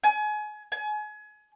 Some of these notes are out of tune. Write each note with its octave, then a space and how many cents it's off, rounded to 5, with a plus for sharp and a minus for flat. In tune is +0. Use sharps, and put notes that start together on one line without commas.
G#5 +30
G#5 +30